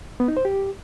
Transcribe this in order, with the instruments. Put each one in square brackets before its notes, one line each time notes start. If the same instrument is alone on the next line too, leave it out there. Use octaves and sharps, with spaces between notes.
[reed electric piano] B3
D#4
C5
G4